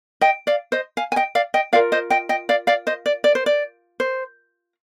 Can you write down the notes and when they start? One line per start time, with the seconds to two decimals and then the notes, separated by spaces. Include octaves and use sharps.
0.21 D#5 G5
0.47 D5 F5
0.72 C5 D#5
0.97 F5 G#5
1.12 G#5
1.16 D#5 G5
1.35 D5 F5
1.54 D#5 G5
1.73 F4 A#4 D5 F5
1.92 C5 D#5
2.10 D#5 G5
2.29 D#5 G5
2.49 D5 F5
2.67 D5 F5
2.87 C5 D#5
3.06 D5
3.24 D5
3.35 C5
3.46 D5
4.00 C5